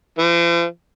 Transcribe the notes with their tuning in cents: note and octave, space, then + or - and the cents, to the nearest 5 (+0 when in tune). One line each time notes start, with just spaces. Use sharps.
F3 -45